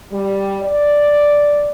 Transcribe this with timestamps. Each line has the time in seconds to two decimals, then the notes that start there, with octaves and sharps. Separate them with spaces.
0.11 G3
0.62 D5